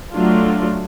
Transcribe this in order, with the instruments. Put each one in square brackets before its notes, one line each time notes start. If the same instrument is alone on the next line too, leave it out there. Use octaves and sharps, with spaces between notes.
[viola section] F#3 A3 D4 F4